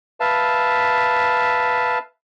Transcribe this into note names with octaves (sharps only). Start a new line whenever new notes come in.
B4 E5 F5 A5